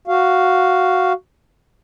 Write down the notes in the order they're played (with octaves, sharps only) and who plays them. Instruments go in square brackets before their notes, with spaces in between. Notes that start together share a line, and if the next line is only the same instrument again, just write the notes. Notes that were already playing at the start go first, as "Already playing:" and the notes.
[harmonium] F#4 F5